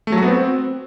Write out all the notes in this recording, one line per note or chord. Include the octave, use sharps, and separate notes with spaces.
A3
F#3
F#4
B3
C4